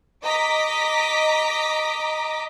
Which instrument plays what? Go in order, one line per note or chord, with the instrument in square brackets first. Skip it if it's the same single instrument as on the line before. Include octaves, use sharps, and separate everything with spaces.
[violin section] D#5 A#5 D6 B6